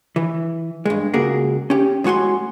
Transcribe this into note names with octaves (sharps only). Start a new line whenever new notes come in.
E3
G2 G#3
C#2 A#3 F#4 G#4 A#4
C#4 G4
A2 G#3 F#4 G#5 C6